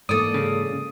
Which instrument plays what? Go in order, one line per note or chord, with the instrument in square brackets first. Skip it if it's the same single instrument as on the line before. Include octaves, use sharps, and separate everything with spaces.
[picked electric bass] G#2 E3 A#3 [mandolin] A4 D5 [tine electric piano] D#6
[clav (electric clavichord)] C#3